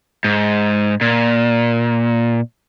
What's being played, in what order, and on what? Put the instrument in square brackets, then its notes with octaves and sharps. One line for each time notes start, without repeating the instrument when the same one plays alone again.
[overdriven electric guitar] G#2
A#2